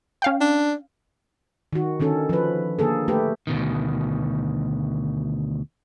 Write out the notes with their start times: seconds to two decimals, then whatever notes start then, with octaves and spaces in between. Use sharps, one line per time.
0.22 C#4 F5 G5
0.41 D4
1.73 D#3 F#4
2.00 D3 D#3 C#4 A4
2.29 F3 B4
2.79 D3 A#3 G#4 A4
3.08 A3 G4 B4
3.47 D2 B2 D#3